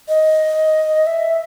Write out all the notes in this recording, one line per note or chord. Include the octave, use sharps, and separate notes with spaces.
D#5
E5